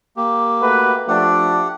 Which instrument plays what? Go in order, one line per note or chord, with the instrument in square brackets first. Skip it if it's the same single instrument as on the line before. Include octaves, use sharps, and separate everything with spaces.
[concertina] A#3 G4
[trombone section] A3 F#4 B4
[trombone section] F3 A3 D4 [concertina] G4 F#5